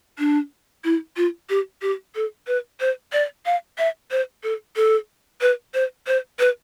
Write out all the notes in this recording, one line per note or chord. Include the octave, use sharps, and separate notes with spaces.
D4
E4
F4
G4
G4
A4
B4
C5
D5
F5
E5
C5
A4
A4
B4
C5
C5
B4